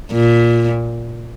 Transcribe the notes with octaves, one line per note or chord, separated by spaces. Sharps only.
A#2